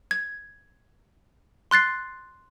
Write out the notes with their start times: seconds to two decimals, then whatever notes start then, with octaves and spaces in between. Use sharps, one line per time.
0.11 G#6
1.71 C6 F#6 A6 C7